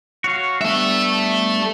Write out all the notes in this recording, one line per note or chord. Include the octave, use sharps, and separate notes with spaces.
F#4 C#5 F5
G3 B3 D4 A4 E5